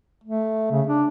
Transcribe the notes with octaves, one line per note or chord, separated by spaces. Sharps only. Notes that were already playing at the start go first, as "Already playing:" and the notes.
A3
C#3
D4